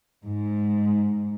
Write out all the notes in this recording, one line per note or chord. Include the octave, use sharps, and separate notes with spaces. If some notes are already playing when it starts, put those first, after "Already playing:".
G#2